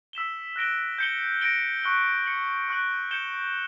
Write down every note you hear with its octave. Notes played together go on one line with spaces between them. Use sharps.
E6 B6 E7 G7
F#6 A#6 D7 G7
G6 C#7 G7
A#6 D7 G7
C#6 F#6 C#7 G7
F#6 C#7 F#7
C#6 F#6 C#7 F#7
G6 C#7 E7 G7